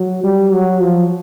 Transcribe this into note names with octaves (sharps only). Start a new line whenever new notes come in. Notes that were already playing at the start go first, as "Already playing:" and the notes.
Already playing: F#3
G3
F#3
F3